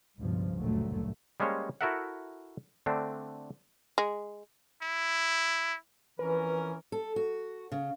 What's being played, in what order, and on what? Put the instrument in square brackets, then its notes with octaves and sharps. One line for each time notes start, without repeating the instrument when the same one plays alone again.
[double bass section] C#2 G2 B2 F3
F#1 D2 G2 A#2 F#3 A3
[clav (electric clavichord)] G3 G#3 A#3 C#4 C5 C#5
E4 F#4 A4 A#4 E5 F#5
D3 A3 C4 D4
[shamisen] G#3
[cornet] E4
[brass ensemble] F2 C#4 A#4 [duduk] E3 [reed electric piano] B4
[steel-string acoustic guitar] A4
F#4
C#3